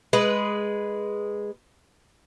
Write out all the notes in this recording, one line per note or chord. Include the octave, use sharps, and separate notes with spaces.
G#3 B4